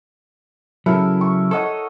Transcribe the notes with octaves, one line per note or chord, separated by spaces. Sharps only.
C#3 F#3 E4 A4 A#4
C#6
A4 C#5 D#5 F#5